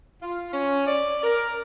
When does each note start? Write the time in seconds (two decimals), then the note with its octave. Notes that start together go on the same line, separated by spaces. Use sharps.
0.21 F4
0.52 C#4
0.86 D5
1.24 A#4